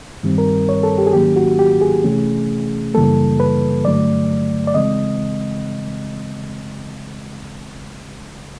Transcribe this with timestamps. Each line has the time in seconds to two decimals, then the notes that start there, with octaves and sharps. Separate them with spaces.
0.23 G2 D#3 G3 C4
0.38 A#4
0.69 C#5
0.83 A4
0.98 G4
1.06 G#4
1.13 G#2 D#3 F#3 A#3 C#4 G4
1.36 F#4
1.59 G4
1.81 G#4
2.04 C3 E3 A3 C#4
2.94 F#2 C#3 E3 G3 A#3 A4
3.40 B4
3.84 G2 D3 F#3 A3 D5
4.67 D5
4.74 C#3 E3 G#3 C4 D#5